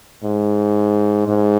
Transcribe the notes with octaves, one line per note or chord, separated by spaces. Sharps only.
G#2
G#2